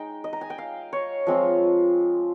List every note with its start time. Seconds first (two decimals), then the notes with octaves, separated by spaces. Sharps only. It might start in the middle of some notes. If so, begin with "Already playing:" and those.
Already playing: G#3 D#4 G5
0.24 D#5
0.33 A#5
0.41 G#5
0.50 G5
0.58 F5
0.93 C#5
1.27 F3 G#3 C4 F4